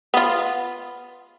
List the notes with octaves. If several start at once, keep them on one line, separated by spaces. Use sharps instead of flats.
B3 F4